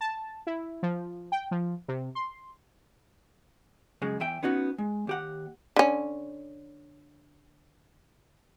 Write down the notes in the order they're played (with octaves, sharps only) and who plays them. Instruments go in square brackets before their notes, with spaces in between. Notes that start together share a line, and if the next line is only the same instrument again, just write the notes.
[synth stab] A5
E4
F3
G5
F3
C3
C6
[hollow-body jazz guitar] F#2 C#3 G#3
E2 E3 E5 G5
B3 C#4 D#4 F#4
G#3
D#2 G4 F#5
[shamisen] D3 C#4